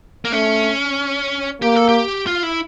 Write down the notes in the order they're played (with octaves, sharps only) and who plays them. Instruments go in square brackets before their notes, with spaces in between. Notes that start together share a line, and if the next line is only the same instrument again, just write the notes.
[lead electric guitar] A#3
[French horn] A3 [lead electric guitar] C#4
[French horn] A#3 [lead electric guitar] G4
[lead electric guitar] A4
G4
F4
E4